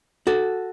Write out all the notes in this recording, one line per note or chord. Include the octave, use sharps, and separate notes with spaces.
F#4 A4